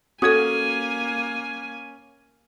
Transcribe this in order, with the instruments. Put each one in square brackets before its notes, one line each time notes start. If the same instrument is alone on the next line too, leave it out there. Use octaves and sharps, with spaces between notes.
[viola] A#3 G#5 [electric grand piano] C#4 G#6 [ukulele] F#4 [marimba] A4 D#6